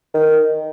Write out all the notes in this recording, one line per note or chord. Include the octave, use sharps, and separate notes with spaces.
D#3